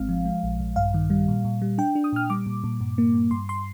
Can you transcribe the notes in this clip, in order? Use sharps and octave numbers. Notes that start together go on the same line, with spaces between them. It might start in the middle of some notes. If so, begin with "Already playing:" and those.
Already playing: G#1 G#3 C4 F5
F3
G#3
A#1
A#1
G2 F5
D#3
G3
A#2
A#2
G3
D4 G5
D4
D#6
A#2 F6
G3 D6
A#2
A#2
G2
A#3
G2
G2 C6
C6